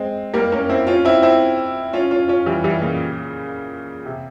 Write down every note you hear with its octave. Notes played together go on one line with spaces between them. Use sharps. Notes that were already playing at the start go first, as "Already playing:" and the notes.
Already playing: G#3 C4
G3 A#3
A#3 C#4
C4 E4
C#4 F4
C4 E4
C4 E4
C#4 F4
C#4 F4
C#4 F4
E3 G3
E3 G3
A#2 C#3
C3